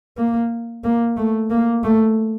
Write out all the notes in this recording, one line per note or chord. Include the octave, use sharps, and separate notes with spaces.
A#3
A#3
A3
A#3
A3